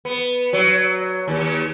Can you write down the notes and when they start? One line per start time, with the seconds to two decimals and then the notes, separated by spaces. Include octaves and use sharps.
0.05 B3
0.53 F#3
1.28 D#2